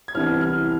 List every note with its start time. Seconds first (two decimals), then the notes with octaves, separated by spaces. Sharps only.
0.08 G#6
0.15 C2 C3 E3 B3 F6
0.41 F6